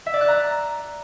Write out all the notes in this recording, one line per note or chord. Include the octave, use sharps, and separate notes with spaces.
E5
D5
F#6
A#5